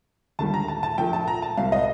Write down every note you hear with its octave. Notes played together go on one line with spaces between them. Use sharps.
D#2 D3 G3 A5
A#5
A5
A5
A#1 A#2 A3 G5
A5
A#5
A5
C2 C3 G3 F5
D#5